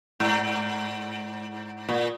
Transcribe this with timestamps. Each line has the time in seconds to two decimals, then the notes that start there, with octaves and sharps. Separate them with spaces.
0.20 G#2
1.89 A#2